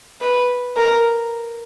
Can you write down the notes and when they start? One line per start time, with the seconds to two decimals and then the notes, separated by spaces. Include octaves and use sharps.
0.21 B4
0.77 A#4